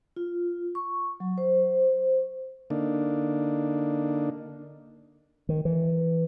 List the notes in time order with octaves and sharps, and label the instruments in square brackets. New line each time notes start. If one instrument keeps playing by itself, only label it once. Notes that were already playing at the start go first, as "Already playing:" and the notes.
[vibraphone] F4
C#6
F#3
C5
[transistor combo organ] D3 A#3 D4 D#4
[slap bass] D#3
E3